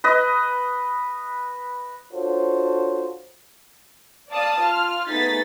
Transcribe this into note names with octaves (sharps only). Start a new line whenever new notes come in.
B4 D#5
D4 F4 F#4 A4 C5 C#5
D5 F5 A5 D#6
F4 F6
A3 B3 D#4 G#4 A6 B6